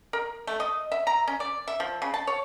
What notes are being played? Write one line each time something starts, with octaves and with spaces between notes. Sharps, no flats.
A#4
A3
D#5
E5
A#5
C#4
D5
E5
F3
C#3
A5
C#5